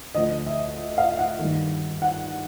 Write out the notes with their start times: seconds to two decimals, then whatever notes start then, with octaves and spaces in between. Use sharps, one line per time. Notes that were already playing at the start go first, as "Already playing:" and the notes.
0.15 D2 D3 F3 D#5
0.46 E5
0.98 F5
1.19 F#5
1.39 G2 D#3
2.02 F#5